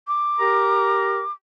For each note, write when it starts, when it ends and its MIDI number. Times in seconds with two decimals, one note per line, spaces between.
0.08 1.32 86
0.39 1.22 67
0.39 1.22 70
0.39 1.22 82